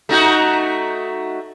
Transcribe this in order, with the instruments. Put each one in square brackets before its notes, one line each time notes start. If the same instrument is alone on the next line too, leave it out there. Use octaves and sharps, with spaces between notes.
[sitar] A3 D#4 F#4